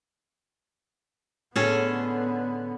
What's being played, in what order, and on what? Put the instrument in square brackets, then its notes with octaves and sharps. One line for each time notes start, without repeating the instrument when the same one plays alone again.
[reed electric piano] A2 [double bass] D3 B3 [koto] C#4 G#4 A4